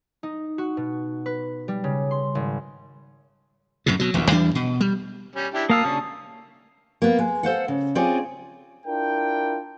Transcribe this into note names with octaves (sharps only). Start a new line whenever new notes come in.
D#4
F#4
B2
B4
G3
C#3
C6
G#1
F#2 A2 C3
B2 F#3
D#1 A#1 D#2
E2 E3 G3 D4
B2
G3
G3 C#4
D4 E4 G4
A#3 F5 A5 D#6 E6
C#3 C#4 D4
A#3 B3
G#3
A4 C5 F5 F#5
C#3
C4 C#4 F4 G#4 D5
D4 E4 F4 A#4 G5